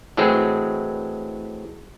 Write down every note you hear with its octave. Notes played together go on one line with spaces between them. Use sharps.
A2 E3 F#3 G#3 C4 G#4